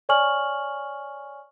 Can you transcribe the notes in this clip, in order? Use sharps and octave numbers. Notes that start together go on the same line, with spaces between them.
C#5 D5 G#5 C#6 F6 F#7